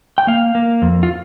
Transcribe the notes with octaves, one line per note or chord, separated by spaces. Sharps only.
G5
A#3 F5
A#3
F2
F4